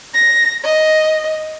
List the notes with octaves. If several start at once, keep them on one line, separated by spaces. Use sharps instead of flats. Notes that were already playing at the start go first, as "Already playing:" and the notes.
A#6
D#5